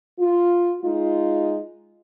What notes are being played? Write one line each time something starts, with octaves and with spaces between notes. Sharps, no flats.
F4
G#3 D#4 F4